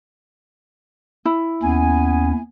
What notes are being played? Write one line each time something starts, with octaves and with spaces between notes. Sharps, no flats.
E4
D#2 B3 C#4 G#5